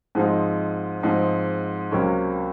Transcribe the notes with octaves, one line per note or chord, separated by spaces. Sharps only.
G#2 F3 G#3 C4 D#4
G#2 F3 G#3 C4 D#4
C#2 C3 F#3 A#3 C#4